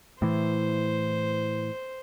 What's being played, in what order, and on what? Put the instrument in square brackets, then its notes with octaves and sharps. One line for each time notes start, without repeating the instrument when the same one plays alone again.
[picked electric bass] A2 E3 [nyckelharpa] C5